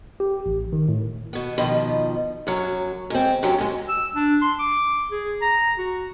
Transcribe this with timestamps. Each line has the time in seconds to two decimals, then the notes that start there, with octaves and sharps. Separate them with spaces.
0.20 G4
0.46 A1
0.73 D#3
0.89 A2
1.33 B2 B3
1.58 B2 D#3 F3
2.47 F#2 F#3
3.10 G#2 C4
3.43 F#2 F#3 G4
3.58 G#2 G#3
3.88 E6
4.15 D4
4.42 C6
4.59 D6
5.11 G#4
5.42 A#5
5.78 F#4